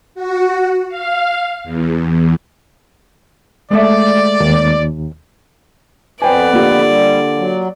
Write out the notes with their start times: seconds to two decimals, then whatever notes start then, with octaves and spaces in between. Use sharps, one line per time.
0.15 F#4
0.89 F5
1.64 E2
3.71 G#3 A3 D5 E5
4.40 D#2
6.22 F2 B3 B4 C5 D5 G5 G#5
6.53 D3 A#3 F4 G4
6.89 G3
7.38 F#3